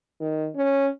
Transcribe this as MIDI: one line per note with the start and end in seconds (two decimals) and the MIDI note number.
0.21 0.48 51
0.55 0.88 61